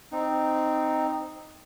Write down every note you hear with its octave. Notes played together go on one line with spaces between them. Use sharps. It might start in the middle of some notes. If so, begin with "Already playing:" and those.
C4 D#4